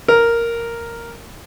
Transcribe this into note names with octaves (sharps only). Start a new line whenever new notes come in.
A#4